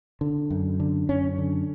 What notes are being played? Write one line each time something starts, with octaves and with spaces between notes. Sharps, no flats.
D3
F#2
D3
F#2 C#4
D3